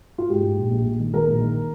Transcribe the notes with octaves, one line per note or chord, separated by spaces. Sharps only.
F4
G#2 G4
G#2
A#1
A#1
A#1
D#3
D#3 A#4
A#1
D#3